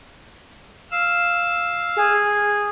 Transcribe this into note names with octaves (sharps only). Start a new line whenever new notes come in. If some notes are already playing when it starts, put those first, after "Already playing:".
F5 E6
G#4